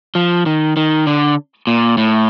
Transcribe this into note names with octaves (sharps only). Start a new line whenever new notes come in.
F3
D#3
D#3
D3
A#2
A2